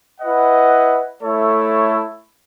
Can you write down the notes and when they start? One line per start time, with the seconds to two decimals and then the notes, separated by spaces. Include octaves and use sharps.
0.20 E4 B4 D#5 F#5
1.22 A3 E4 A4 C#5